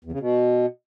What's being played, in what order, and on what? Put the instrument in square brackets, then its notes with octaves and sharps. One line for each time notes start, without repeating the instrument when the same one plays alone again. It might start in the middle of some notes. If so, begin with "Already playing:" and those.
[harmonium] E2
C#3
B2